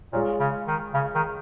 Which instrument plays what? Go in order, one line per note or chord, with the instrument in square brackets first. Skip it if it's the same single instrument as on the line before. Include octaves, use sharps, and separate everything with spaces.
[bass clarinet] A#2 [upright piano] G#3 F4 C#5
[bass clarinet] C#3
D#3
C#3
D#3